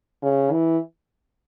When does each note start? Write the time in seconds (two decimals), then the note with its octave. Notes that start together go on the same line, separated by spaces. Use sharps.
0.23 C#3
0.52 E3